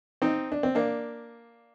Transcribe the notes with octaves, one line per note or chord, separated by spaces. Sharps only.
C4 D#4
D4
C4
A#3 D4